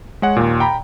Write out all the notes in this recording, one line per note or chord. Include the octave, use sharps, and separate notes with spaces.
G#3 C#5 F#5
D#2 A#2
G5 A#5 B5